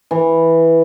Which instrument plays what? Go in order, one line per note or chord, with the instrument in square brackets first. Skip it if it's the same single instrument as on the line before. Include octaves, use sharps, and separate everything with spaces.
[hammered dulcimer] E3